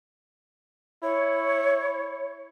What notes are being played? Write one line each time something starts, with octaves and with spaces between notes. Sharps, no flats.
E4 C#5